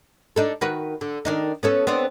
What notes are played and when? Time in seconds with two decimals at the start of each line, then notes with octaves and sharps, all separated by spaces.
0.36 D4 D#4 A4
0.61 D#3 F#4 B4
1.01 D3
1.25 D#3 D4 D#4
1.63 B3 C#4 A4
1.87 B3 C4 D4